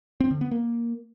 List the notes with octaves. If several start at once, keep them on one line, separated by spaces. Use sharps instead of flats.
C4
D3
B3
A#3